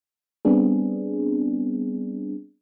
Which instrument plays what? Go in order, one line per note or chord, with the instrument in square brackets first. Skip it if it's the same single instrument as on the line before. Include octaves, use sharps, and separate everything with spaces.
[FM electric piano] G3 B3 C4 D4 G#4